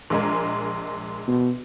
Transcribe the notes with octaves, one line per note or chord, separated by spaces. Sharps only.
A#1 G#3 A#4
B2